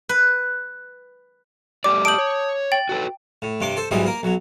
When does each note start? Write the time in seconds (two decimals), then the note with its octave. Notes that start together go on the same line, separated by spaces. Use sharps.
0.09 B4
1.84 A3 G4 D5 D6
2.05 A5 D#6 G6 D7 F#7
2.18 C#5
2.72 G5 A6 F#7
2.89 F#4 A4 B4
3.42 A2
3.61 G2 C3 C6 D6
3.77 A4 C5
3.91 B1 G#2 E3 G3 C4 D#5
4.06 A#3 A#4
4.23 B1 F#3